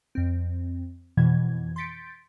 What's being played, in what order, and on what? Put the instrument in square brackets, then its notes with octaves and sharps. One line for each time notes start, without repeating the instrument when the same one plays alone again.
[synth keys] F2 C4
F2 B2 E3 G#6
C6 G6 A6 B6 C#7 D7